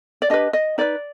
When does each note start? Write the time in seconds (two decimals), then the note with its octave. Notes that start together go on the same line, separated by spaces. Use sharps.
0.22 D5
0.30 D4 G4 B4 D#5
0.53 D#5
0.78 D#4 B4 D5